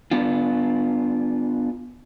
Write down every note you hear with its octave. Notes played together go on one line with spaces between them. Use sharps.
B3 D4 F4